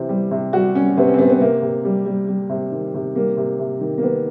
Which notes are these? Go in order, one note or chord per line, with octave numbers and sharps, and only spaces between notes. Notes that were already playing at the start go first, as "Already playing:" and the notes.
Already playing: C3 E3 C5
G3
C3
G3 F#4
G3 C#4
C3 B3
C#4
C4
C3 B3
B3
C3 A#3
C3
G3
G3
G3
C3
D#3
C3
G3 A#3
C3
C3
D#3
A#3
D#3 B3